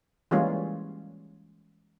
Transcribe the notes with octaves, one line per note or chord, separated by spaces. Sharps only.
E3 G3 G#3 A#3 C#4 F4